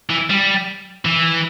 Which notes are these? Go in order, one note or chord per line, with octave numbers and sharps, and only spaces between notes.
E3
G3
E3